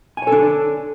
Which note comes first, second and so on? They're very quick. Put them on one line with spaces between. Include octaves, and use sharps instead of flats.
G#5 C#5 A4 D4